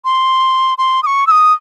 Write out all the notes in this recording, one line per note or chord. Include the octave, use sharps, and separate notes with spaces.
C6
C6
D#6
C#6
E6
D#6